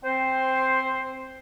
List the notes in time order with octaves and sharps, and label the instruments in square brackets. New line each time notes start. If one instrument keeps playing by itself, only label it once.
[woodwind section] C4 C5